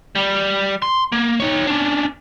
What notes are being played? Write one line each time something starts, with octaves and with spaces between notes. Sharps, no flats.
G3
C6
A#3
D#4 C#5
C#4 D4